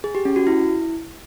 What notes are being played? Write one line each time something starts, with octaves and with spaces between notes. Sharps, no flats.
G#4
G4
C#4
F#4
E4